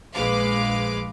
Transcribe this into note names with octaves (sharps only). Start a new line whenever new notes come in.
A#1 G#3 B4 F5 D6